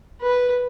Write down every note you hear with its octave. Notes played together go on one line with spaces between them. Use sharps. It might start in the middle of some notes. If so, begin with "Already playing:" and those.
B4